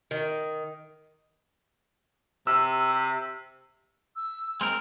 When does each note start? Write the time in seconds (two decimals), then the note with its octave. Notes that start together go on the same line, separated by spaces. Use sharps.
0.11 D#3
2.47 C3 E6
4.16 E6
4.61 G#3 C4 A#4 F6